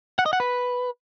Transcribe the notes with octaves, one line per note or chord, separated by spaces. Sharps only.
F#5
D#5
F#5
B4